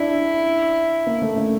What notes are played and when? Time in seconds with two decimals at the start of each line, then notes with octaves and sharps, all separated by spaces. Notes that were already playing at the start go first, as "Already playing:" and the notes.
Already playing: D4 E4
1.07 A#3
1.22 A3
1.37 A3